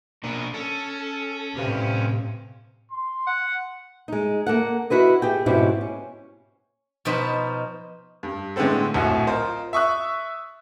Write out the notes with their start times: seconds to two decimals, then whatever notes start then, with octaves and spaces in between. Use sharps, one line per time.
0.24 B2 A#3 D4
0.54 C#4 A4
1.57 A2 C3 G4 B4 F5
2.92 C6
3.27 F#5
4.08 G#3 D#4
4.46 A#3 A4 F#5
4.90 E4 F#4 B4 D#5
5.22 G4 G#4 G5
5.46 G#2 B2 C4 C#4 E4 G4
5.81 C#4
7.05 B2 F3 D#4 F4 B4 F#5
8.23 G2
8.56 A2 D3 G#3 B3 C4 A4
8.94 D1 A#1 A2 F#4
9.27 F4 A#4 C5 D#5
9.73 E5 C#6 D#6 F#6